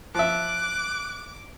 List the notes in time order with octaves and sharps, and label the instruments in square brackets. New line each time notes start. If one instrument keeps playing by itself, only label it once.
[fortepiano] F3 E5 [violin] D6 [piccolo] F#6